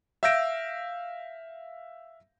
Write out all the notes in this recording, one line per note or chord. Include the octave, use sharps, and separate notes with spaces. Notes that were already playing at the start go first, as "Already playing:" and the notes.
E5 F5 E6 G6 A#6 D7